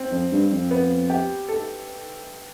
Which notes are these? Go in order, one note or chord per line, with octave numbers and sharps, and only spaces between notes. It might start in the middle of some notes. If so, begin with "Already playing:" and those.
Already playing: C4
F2
G2
F2
B3
G4
A4